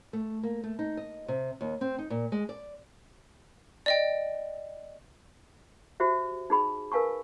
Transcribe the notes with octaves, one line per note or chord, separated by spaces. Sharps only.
A3
A#3
A3
D#4
D#5
C3
D#2
C4
D#4
A#2
G#3
D5
D5 D#5 G5
F#4 G4 C5 E5
D#4 G#4 B5
A#4 B4 F5 G#5 A5 C#6